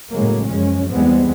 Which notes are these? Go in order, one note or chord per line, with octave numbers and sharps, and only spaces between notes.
A2 C#3 F#3 G#3 A#3
F#2 F3 G#3 C#4
E2 G3 G#3 B3 C4